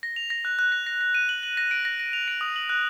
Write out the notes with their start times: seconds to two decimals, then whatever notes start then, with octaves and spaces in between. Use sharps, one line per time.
0.03 A#6
0.16 F7
0.30 A#6
0.45 F#6
0.59 F#6
0.72 A#6
0.87 A#6
1.01 A#6
1.14 D#7
1.29 F#7
1.43 F#7
1.57 A#6
1.71 D7
1.85 A#6
2.00 A#6
2.13 F7
2.28 D7
2.41 D#6
2.56 F#7
2.69 F#6